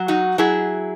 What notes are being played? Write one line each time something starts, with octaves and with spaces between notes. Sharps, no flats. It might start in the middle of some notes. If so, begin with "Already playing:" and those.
Already playing: F#3
D#4 F#4
F#3 E4 G#4